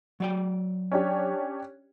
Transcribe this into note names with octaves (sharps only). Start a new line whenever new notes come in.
F#3 D5 G5
C#4 D4 G4